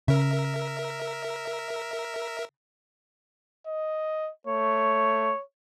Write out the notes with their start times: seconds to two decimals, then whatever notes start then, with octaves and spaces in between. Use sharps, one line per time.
0.08 C#3 A#4 E5
3.67 D#5
4.47 A3 C#5